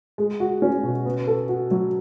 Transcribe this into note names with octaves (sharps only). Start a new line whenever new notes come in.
G#3
F#4
C#4
B2
B3
A4
F#4
F#3